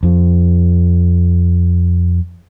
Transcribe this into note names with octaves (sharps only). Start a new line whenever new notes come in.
F2